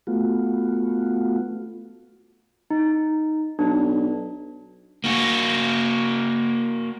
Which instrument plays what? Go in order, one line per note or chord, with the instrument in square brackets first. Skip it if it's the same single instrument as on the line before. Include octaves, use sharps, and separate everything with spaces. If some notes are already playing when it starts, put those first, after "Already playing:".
[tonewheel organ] A3 B3 F4 F#4
[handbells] D#4
[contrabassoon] B1 [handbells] D4
[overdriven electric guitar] A#3 F#4